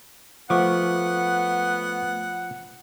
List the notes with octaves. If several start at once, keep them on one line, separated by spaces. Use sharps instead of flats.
F3 A3 B3 F#5 C#6 D6